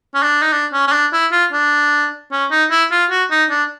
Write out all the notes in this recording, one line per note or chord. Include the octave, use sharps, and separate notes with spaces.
C#4
D4
D#4
D4
C#4
C#4
D4
E4
F4
D4
C#4
D#4
E4
F4
F#4
D#4
D4